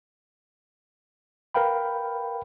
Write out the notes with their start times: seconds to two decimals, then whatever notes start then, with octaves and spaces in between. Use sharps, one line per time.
1.54 A#4 B4 F5 G5 B5